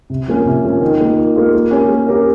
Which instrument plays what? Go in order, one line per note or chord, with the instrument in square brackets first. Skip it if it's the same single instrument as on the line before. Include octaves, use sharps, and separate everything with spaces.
[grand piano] C3
F3 A#3 C#4
C3
F3 A#3 C#4
D#3
A#3 F4
D#3
A#3 F4
A#3
C#4 G4 A#4 C#5
A#3
C#4 G4 A#4 C#5